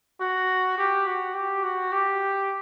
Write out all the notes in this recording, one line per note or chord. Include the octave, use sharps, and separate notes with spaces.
F#4
G4
F#4
G4
F#4
G4